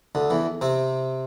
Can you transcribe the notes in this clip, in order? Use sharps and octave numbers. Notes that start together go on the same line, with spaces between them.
D2 D3
E2 E3
C3 C4